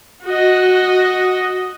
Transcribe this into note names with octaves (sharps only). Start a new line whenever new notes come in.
F#4 D#5